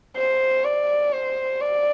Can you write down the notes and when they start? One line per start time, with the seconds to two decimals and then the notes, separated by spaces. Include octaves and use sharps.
0.16 C5
0.64 D5
1.13 C5
1.61 D5